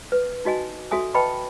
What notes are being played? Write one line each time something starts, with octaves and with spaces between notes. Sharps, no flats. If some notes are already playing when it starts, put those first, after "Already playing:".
B4
D#4 F#4 D#5 G#5
F#4 A4 E5 G#5 D#6
B4 D#5 G5 A5 B5 C#6